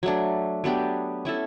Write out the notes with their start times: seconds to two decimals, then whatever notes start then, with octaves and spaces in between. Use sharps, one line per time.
0.03 F#3 A3 D4
0.64 F#3 B3 D4 G4
1.25 C#4 E4 A4